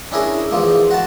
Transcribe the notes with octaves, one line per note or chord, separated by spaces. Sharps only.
C#4 D4 E4 G#4 A#4
E2 F3 A#3
F#4 A5